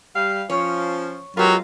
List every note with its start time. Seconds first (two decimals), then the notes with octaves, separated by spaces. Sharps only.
0.16 G3 F5
0.50 F3 C#4 C#5
1.37 F#3 G#3 B3 F4 G4 A#4